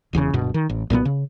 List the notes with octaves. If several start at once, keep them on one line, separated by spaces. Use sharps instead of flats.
E1 E2 A2 C#3
D1 G2 B2
D#3
A1
B1 A#2 G#3 B3
C#3